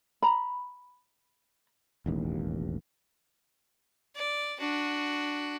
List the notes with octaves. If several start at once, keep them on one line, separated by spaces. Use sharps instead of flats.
A#5 B5
E1 A1 D#2
D5
D4 F#4